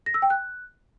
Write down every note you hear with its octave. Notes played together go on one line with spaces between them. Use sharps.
A#6
E6
G5
F#6